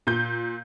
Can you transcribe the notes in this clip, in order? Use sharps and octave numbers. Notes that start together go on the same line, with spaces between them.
A#2 G6